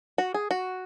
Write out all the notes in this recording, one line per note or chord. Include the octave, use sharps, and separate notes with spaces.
F#4
G#4
F#4